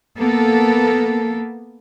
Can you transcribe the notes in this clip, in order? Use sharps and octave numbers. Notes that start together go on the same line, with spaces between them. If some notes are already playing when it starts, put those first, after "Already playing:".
A#3 B3 A4